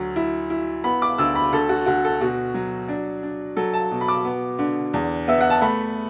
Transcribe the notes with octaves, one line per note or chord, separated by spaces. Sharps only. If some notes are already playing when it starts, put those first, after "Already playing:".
Already playing: D2 F#3
E4
E4
B3 B5
D6
D2 E6
B5
D2 A4
F#4
D2 F#4
A4
B2 F#4
F#3
D4
D4
F#3 A4
A5
B2
B5
D6
B3
D3
E2
B3 E5
F#5
A5
A3 B5